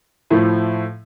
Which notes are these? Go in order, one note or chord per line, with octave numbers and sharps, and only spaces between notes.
A2 F3 A3 E4